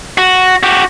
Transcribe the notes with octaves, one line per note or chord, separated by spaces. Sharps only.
F#4
F#4 G4